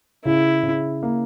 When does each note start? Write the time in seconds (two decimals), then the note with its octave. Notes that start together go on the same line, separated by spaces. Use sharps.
0.24 C#3 E4
0.63 C#3
1.03 A#3